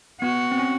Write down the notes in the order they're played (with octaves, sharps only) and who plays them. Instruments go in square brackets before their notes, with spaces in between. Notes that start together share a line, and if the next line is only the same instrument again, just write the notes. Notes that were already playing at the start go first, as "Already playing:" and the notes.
[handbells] B3 [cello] F#4
[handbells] C4
C#4